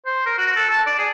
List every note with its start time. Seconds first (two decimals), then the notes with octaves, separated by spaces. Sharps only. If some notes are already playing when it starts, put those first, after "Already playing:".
0.06 C5
0.26 A#4
0.38 F#4
0.56 A4
0.69 A5
0.87 D5
0.98 G#4